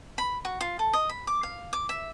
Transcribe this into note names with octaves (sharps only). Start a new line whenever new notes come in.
B5
F#4
F4
A4
D#5
B5
D6
F5
D6
E5